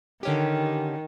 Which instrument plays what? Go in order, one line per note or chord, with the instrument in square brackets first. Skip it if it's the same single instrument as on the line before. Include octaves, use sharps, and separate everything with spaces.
[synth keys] D3 C#4 G4 [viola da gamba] D#3